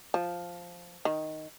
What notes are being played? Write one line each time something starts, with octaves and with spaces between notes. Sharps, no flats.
F3
D#3